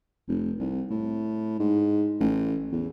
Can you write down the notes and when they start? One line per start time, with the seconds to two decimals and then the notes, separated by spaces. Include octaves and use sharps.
0.28 F1
0.60 C2
0.90 A2
1.60 G#2
2.20 A1
2.72 E2